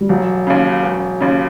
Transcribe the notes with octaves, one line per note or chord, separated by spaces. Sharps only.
G3
E1 F#3
D#2 C#3
E1
D#2 C#3